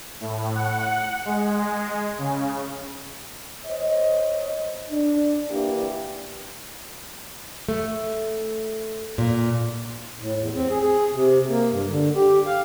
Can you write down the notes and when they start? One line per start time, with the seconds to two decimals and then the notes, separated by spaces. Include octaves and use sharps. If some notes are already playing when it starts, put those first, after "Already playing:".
0.20 A2
0.55 F#5
1.25 G#3
2.18 C#3
3.66 C5 C#5 D#5
4.90 D4
5.50 E3 A#3 D4 G4
7.69 A3
9.18 A#2
10.21 A2
10.39 E2
10.55 C4
10.70 G#4
10.83 G#4
11.14 C3
11.49 A#3
11.71 G2
11.89 D3
12.16 G4
12.46 F5